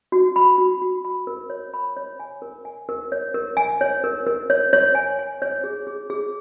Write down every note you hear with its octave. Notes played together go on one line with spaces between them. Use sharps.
F#4
B5
F#4
F#4
B5
A#4
C#5
B5
C#5
G#5
A#4
G#5
A#4
C#5
A#4
G#5
C#5
A#4
A#4
C#5
C#5
G#5
G#5
C#5
G#4
G#4
G#4